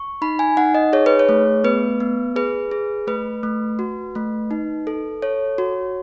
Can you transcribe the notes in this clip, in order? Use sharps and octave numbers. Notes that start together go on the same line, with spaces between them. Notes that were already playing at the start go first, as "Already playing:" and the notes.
Already playing: C#6
D#4 B5
G#5
D#4 F#5
D#5
G#4 C#5
B4
C#5
A3
B3 B4
B3
G#4 B4
G#4
A3 B4
A3
F#4
A3
D#4
A4
A4 C#5
F#4